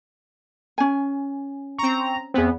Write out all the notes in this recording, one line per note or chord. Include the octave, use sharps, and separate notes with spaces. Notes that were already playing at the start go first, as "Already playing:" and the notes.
C#4 G#5
C4 A#5 C#6
E2 B3 C4 G#4